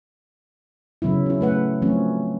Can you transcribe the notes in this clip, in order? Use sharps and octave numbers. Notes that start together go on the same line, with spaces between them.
C#3 F#3 B3 E4
C#4 E4
A3 B4 F#5
F3 F#3 A3 C4 C#4